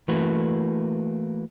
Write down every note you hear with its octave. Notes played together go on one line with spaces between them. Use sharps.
E3 A3 A#3 F#4 B4